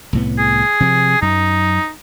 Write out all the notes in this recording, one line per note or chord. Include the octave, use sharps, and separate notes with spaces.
C2 A2 B3
G#4
C3 F3
F#2 D#4